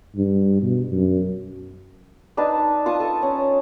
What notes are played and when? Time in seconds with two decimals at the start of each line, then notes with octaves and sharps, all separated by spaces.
0.16 G2
0.62 B2
0.92 F#2
2.37 D4 D#4 B4 A5
2.86 F4 A5 C#6 D#6
3.00 A4
3.23 C#4